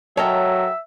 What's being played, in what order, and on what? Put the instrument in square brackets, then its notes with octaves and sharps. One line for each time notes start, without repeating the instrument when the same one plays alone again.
[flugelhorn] F#3 [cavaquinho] A4 A#4 G5 [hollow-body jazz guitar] C#5 D#5 [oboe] E5